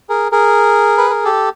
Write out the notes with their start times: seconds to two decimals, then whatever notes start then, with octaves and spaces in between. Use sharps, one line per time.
0.09 G#4 A#4
0.32 G#4 A#4
0.98 B4
1.10 A#4
1.25 G4 A4